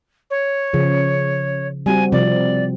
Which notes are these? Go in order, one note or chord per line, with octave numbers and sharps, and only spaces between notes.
C#5
C#3 F3
G3 C4 F#4 G#5
C3 F3 C4 D5